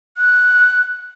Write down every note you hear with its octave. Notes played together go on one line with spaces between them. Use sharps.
F#6